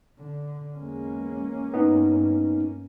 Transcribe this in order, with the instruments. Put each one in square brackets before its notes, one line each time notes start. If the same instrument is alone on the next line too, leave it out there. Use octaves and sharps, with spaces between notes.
[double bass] D3
[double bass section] E2 G#3 [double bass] A#3 C#4
[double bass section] G2 [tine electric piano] B3 D#4